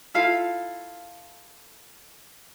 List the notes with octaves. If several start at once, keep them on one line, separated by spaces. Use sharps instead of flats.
E4 F4 A4 F5